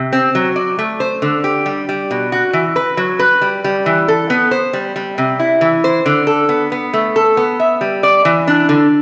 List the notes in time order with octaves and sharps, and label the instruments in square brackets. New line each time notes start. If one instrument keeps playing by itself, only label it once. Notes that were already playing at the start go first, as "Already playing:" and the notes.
Already playing: [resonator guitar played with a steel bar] C3
C4
F#3
D5
A3
C5
D3
G4
G3
G3
B2
F#4
E3
B4
F#3
B4
G3
G3
E3
A4
B3
C5
G3
G3
C3
E4
E3
C5
D3
A4
B3
B3
A3
A4
B3
E5
G3
D5
E3
D4
D3